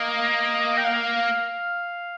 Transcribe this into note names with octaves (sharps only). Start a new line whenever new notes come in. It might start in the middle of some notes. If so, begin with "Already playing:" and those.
Already playing: A#3 D#5
G5
F5